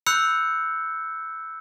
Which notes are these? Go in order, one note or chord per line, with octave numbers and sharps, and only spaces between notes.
B5 E6 F#6 G6 C#7